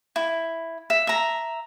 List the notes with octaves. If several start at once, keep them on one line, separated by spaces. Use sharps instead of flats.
E4
E5
E5 A#5